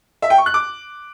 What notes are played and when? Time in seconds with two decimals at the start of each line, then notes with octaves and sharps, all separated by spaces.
0.22 E5
0.30 G5
0.38 C#6
0.46 F#6
0.54 D6